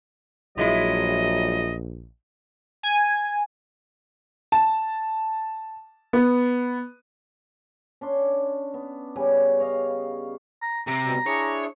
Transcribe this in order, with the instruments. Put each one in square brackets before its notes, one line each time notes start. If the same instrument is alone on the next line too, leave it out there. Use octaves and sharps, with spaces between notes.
[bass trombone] A#1 [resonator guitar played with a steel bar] F3 G#3 E4 [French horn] F#3 [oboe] D#5
[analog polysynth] G#5
[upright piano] A5
B3
[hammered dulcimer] C#4 D4 C6
B3
C#3 G3 C#5 G#5
C#5 D#5 F5
[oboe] A#5
[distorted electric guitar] C3 C4 [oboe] A#5
[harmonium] B2 G3
[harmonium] D4 E4 G#4 [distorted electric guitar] C#5